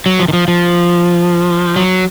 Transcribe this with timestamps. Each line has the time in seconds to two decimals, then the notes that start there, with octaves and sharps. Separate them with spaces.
0.06 F#3
0.20 F3
0.28 D#3
0.33 F3
0.48 F3
1.76 F#3